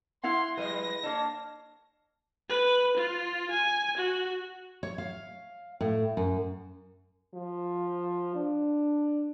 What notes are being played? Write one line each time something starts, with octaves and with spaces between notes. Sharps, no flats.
E4 F5 F#5 C6
F3 G3 G#3 B4 A#6
A#3 D4 C#5 A5
B4
F4
G#5
F#4
C#5
F5
A2
F#2
F3
D4